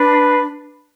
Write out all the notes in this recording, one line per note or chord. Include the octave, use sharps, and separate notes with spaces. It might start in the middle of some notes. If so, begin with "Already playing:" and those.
Already playing: D4 B4